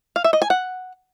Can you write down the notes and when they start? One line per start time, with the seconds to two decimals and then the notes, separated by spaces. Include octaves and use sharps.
0.16 F5
0.24 E5
0.33 D#5
0.42 G#5
0.50 F#5